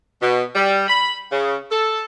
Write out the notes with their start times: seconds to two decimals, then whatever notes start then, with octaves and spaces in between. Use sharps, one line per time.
0.22 B2
0.55 G3
0.88 B5
1.32 C#3
1.70 A4